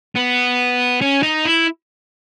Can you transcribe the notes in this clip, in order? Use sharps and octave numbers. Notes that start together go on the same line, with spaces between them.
B3
C#4
D#4
E4